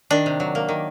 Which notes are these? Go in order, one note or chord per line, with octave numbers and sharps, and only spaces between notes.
D#3 D4
C3
F#3
A#3
D#3